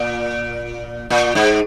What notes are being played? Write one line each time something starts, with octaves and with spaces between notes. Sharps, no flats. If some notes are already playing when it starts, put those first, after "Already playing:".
Already playing: A#2
A#2
G#2